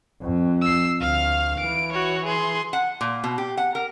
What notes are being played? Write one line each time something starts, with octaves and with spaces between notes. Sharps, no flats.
F2
E6 C7
D2 F5 F6
E3 D7
F#4 C#5
G#4 C6
F#5
A#2
B2
G4
F#5
A#4